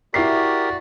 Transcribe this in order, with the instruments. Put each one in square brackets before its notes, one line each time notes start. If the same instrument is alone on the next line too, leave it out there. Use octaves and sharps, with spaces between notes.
[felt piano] E4 E5 C7 [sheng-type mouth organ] F#4 D5 [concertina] G4 A#4